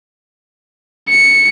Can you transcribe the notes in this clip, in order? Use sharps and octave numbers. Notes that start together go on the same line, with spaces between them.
C#7